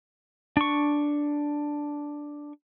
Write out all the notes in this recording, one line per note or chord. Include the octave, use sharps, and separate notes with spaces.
D4 C#6